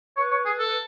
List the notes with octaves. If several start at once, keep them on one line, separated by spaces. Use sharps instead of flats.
B4 C#5
C#5
G#4
A4
B4